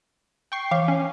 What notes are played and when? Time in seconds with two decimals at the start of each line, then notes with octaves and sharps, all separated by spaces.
0.52 G5 C#6 C7
0.71 E3 F5
0.88 C#4